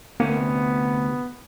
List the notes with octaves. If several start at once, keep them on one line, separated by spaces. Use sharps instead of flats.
D2 C3 A#3 B3 C#4